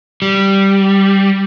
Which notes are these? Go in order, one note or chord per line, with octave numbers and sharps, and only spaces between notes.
G3